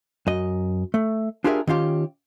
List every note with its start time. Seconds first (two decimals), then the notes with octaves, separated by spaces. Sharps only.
0.27 F#2 D#5
0.94 A3
1.44 D4 F4 G4 G#4 A#4 E5
1.67 D#3 C#4 F4 G4